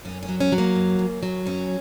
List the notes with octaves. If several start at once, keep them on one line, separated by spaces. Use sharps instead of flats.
F#2 C#4
C#4
F#3
C#4
F#3
A#3
F#2
F#2
F#3
F#2 C#4